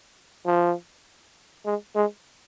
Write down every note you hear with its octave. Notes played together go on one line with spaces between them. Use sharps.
F3
G#3
G#3